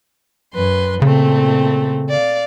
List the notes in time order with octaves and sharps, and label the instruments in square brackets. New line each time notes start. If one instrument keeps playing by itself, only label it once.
[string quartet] F#2 B4 C6
[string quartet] A#2 A3 C4 [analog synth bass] C#3
[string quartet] D5 F5